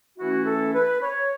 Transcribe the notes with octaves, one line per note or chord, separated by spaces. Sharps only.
E3 A3 C#4 E4 F#4
A4
B4
C#5